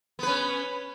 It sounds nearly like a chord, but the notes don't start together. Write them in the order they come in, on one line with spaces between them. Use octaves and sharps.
B3 B4 C#4